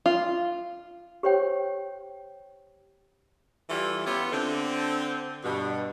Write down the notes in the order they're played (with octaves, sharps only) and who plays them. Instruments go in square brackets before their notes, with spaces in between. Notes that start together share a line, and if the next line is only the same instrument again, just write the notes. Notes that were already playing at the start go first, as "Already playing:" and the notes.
[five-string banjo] F4
[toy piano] G4 C5 C#5 G5
[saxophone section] E3 G3 E4 F4 A4
B3 C#4 E4 F4 G4
D3 C4
G2 B2